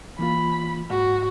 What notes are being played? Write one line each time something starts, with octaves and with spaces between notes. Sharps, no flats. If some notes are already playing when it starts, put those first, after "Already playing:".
E3 A#3 F4 B5
G#2 F#4